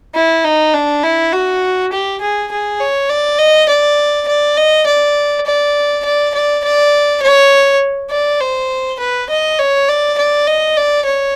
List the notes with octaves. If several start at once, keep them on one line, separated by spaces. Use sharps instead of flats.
E4
D#4
D4
E4
F#4
G4
G#4
G#4
C#5
D5
D#5
D5
D5
D#5
D5
D5
D5
D5
D5
C#5
D5
C5
B4
D#5
C#5
D5
D5
D#5
D5
C#5